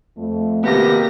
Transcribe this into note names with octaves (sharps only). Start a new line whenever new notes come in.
F2 A3
G#1 C3 A#3 B3 G4 A#6